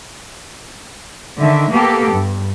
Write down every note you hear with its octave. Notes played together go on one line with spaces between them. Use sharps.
D3 D#3 E5
A#3 B3 G4 A4
G2